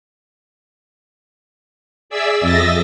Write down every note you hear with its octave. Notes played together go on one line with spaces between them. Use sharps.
G#4 D5 E5 E6
F2 D#5 E5 E6 A6 A#6